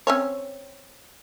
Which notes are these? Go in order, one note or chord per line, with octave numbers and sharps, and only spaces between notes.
C4 C#4 C#5